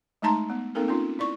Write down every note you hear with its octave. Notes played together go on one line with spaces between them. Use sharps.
G#3 A3 D#4 A5 A#5 C6
B3
A#3 C4 D#4 A4 A#4
C#4 D#4 F4
E4 D5 C#6